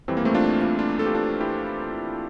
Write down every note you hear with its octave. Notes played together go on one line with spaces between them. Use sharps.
F2 E3 G3 C4
A#3
A3 C4
D4 F4
D4 F4
D4 F4
A4
G4
D4 F4
E4 G4